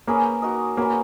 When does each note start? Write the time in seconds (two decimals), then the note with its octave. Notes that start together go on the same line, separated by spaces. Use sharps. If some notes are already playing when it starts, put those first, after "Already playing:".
0.07 A#3 C#4 G#4 B4
0.42 D#4 F#4 A#4 D#5
0.77 A#3 C#4 F#4 B4